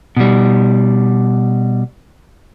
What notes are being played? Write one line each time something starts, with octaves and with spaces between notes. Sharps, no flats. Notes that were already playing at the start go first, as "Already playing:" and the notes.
B2 G3